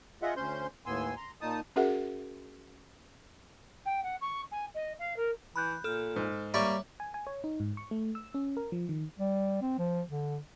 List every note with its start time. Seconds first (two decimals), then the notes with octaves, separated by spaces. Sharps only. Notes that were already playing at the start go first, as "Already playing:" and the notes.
0.22 F4 G#4 D#5 E5 F#5
0.37 D2 C#4 C5 C6 G6
0.86 D#2 A2 B3 G#5 C6 E6
1.16 A#5 C6
1.41 A#2 D#4 A5 D#6
1.76 C#4 F#4 G#4 A#4 E5 F#5
3.86 G5
4.03 F#5
4.21 C#6
4.52 G#5
4.74 D#5
4.99 F5
5.16 A#4
5.56 E3 B5 F#6 G6
5.84 A#2 A4 F6
6.16 G#2
6.54 G3 A#3 C#5 D5 E5 C#6
7.00 G#5
7.14 G#5
7.27 C#5
7.44 D#4
7.60 G#2
7.77 C#6
7.91 A3
8.15 E6
8.34 C#4
8.57 A#4
8.72 F3
8.89 D#3
9.19 G3
9.62 C4
9.79 F3
10.09 D3